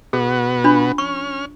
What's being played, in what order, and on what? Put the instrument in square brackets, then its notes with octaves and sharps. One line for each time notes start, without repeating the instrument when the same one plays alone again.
[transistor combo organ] B2 B3 F#4 [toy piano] G#4
[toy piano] D4 F4 B5
[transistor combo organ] C#4 F6 [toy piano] C#6